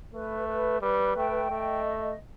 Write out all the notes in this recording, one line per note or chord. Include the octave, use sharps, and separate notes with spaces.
A3 B4
B4
G3 B4
A3 G5
A3 D#5